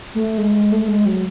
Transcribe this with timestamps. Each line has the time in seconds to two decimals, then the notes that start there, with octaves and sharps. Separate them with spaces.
0.15 A3
0.38 G#3
0.54 G#3
0.72 A3
0.88 G#3
1.06 F#3